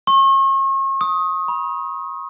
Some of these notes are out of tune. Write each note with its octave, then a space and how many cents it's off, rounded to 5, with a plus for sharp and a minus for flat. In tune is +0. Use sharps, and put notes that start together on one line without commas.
C#6 -40
D#6 +15
B5 -35